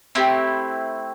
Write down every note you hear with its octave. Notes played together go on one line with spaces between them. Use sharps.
A3 C4 E4 G4